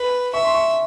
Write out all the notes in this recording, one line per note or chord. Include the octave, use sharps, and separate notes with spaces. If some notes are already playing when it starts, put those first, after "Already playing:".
Already playing: B4
E5 C#6
C6
C#6